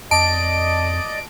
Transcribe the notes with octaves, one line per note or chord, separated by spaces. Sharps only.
F2 D5 D#5 A5 D7